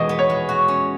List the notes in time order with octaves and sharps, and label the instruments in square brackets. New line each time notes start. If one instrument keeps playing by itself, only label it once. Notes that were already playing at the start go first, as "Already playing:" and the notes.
Already playing: [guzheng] E2 B2 G#3 [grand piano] D#5
[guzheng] B3
[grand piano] C#5
[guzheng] G#3
F#4
C#4